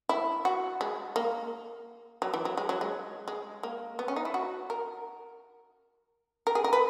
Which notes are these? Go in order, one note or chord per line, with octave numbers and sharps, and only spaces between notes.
E4
F#4
G#3
A#3
F#3
E3
F#3
G#3
F#3
G#3
G#3
A#3
B3
C#4
D#4
E4
F#4
A#4
A#4
G#4
A#4
B4